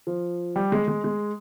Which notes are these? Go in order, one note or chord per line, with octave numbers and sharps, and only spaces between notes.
F3
G3
G#3
G#3
G#3